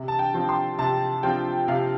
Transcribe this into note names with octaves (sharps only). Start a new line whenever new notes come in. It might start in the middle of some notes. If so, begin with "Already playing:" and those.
Already playing: C3
A5
G5
F3 C4 F4
C6
C3 A5
F3 C4 F4 G5
C3 F5